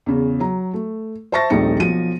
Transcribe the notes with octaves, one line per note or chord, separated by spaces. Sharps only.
E2 C#3
F#3 A#5
A3
C5 E5 A5 C#6 A6 A#6
D#1 A#1 A3 C4 D#4 C#7
B1 F3 D#7